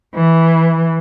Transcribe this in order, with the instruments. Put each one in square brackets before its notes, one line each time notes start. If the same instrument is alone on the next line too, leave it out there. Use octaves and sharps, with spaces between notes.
[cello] E3